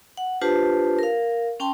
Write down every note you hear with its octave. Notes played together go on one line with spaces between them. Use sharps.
F#5
D4 F4 G4 B4 C5 A5
A#4 F5
C#4 G5 A5 C6